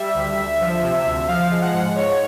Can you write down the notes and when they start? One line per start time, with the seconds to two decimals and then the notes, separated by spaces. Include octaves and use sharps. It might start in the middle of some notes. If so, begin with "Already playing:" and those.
Already playing: G3 E5
0.15 D2
0.38 D2
0.61 F3
0.83 C3
1.06 D2
1.28 F3 F5
1.51 G#3
1.62 F#5
1.74 G#2
1.96 G#2 C#5